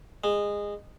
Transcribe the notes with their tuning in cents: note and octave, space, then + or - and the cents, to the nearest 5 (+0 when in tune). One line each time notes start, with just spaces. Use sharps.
G#3 -20